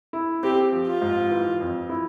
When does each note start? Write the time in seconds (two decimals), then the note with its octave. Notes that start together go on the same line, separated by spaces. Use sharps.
0.13 E4
0.43 C4 G4
0.72 F3
0.87 F4
1.01 G#2
1.31 E3
1.60 F2
1.89 E4